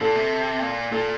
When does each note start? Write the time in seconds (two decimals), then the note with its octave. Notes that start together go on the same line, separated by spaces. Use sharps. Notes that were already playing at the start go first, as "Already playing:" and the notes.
0.01 A#2 A4
0.16 C3
0.61 A#2
0.92 A#2 A4